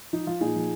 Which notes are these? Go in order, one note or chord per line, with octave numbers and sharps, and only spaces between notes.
F3 D#4
F3 F4
A#2 D#4 G#4
F3